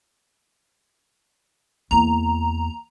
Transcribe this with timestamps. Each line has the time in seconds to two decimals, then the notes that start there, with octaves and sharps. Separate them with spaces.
1.91 E2 A#3 A#5